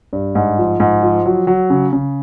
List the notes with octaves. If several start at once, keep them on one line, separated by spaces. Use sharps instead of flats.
G2
G#2
F3
G#2
F3
F#3
F#3
C#3
C#3